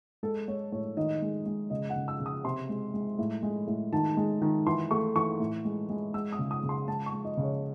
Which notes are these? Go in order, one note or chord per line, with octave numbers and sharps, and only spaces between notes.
G#3 A4
G#3 C#5
A2 C#5
D#3 D#5
G#3
G#3
C#3 D#5
F#5
C#3
E6
C#3
D#6
C3 C6
G#3
G#3
A2
G#3
A2
D#3 A5
G#3
D#3
E3 C6
A3 C#6
E3 C#6
A2
G#3
G#3
G#3 E6
D#6
C#3
D#6
C#3
C6
G#3 A5
C#6
G#3
D#5
C#3
C#5